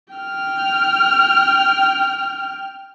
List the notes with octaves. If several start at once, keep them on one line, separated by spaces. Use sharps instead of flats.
G5 F6